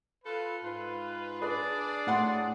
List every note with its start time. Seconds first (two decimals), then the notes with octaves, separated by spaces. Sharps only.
0.24 F4 A4 B4
0.64 G#2 F4 B4
1.42 D4 G#4 B4 D5
2.07 A2 F#5 C6